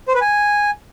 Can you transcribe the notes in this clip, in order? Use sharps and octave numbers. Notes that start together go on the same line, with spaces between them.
C5
B4
G#5